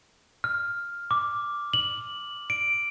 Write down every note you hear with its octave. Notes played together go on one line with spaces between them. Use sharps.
F6
D6
F#7
D7